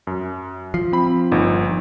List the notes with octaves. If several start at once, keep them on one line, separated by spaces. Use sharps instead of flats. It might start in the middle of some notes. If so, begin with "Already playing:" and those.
F#2
F3 C7
C4 B5
G1 A#2 D#4